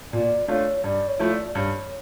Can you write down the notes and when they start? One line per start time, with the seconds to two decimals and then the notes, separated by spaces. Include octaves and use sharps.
0.13 A#2 D5
0.48 A3 D4 F4 C#5
0.84 G2 D5
1.08 C#5
1.19 F3 A3 E4
1.32 D5
1.44 D5
1.55 G2 C#5